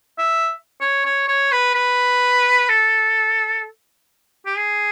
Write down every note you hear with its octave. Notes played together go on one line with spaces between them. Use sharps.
E5
C#5
C#5
C#5
B4
B4
A4
G4
G#4